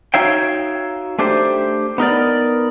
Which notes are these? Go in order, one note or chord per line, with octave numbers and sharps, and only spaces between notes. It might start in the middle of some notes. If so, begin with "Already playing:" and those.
D#4 F#4 C#5 E5 F5 G5
A3 D4 G4 C5
B3 D#4 A#4 D5